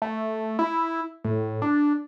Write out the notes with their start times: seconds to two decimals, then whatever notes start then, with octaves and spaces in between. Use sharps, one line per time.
0.02 A3
0.59 E4
1.24 A2
1.62 D4